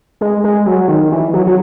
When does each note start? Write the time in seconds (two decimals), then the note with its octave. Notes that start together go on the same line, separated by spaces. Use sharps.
0.21 G#3
0.44 G#3
0.66 F#3
0.88 D#3
1.12 E3
1.34 F#3
1.47 F#3